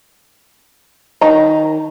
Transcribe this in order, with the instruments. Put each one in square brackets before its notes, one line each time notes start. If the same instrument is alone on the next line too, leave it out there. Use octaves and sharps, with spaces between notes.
[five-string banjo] D#3 D#5 A#5